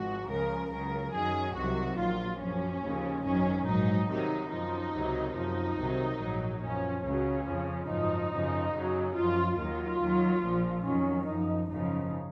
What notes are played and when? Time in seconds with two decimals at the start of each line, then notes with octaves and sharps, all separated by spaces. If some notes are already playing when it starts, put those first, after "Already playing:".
Already playing: G#1 G#2 F3 F#4
0.28 C#2 C#3 F3 A#4
0.70 C#2 C#3 F#3 A#4
1.13 F#2 D#3 F#3 G#4
1.55 C2 C3 D#3 F#3 F#4
1.97 A#1 A#2 F#3 F4
2.40 F#2 F3 C#4
2.82 D#2 C#3 F3
3.24 G#1 F#2 D#3 F#3 C#4
3.67 A#1 G#2 F#3 D#4
4.09 C2 C3 D#3 F#3 D#4
4.51 F#2 F3 D#4
4.94 C#2 C3 D#3 F#3
5.36 F#2 F3 D#4
5.78 C2 C3 D#3 F#3
6.20 A#1 G#2 F#3
6.62 F#2 F3 C#4
7.04 C#2 C#3 F#3 C#4
7.47 F2 C#3 F3
7.89 G#1 F#2 F3 D#4
8.32 F#2 C#3 F3
8.74 F#2 C#3 F#3
9.16 F#2 F3 F4
9.58 D#2 D#3 F#3 F4
10.01 D#2 D#3 F#3
10.43 A#1 A#2 F3
10.85 F2 D#3 F#3 C#4
11.27 F#2 F3 D#4
11.69 G#1 F#2 C#3 F3 D#4